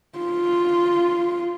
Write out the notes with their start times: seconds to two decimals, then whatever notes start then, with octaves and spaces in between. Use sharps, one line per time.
0.19 F4